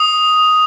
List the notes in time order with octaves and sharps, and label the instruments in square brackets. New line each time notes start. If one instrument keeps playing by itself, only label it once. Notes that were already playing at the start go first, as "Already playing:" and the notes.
Already playing: [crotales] D#6